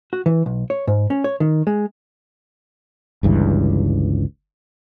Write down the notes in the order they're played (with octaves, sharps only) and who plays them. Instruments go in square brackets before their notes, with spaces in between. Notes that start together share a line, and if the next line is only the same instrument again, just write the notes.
[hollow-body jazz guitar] F#4
E3
B1
C#5
G#2
C#4
C#5
D#3
G#3
[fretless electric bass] G1 C#2 G2 E3